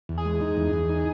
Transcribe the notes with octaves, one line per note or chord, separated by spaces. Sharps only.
E2
G#4
G#3
D#4
E2
E2
D#4